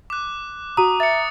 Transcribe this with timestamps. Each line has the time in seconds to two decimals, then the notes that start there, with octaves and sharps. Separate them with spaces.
0.10 D6 F#6
0.77 F#4 A#5 D#6 D#7
1.00 E5 A6 C#7